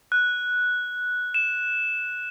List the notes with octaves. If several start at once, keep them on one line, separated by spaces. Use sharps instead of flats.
F#6
E7